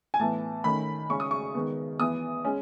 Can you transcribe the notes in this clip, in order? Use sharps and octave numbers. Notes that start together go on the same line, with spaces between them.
G#5
A2 E3 B3 A5
D#3 A3 C#4 B5
C#3 G#3 C#4 C#6
D#6
C#6
D#3 G#3 B3
E3 B3 D#6
G#3 C#4